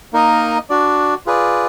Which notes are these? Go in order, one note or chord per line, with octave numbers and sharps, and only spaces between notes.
A#3 D#4 A#4 D#5
D4 F#4 D5
F4 G#4 B4 D5